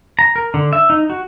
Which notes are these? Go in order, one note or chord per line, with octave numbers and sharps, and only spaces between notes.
A#5
A#4
D3
E5
D#4
F#4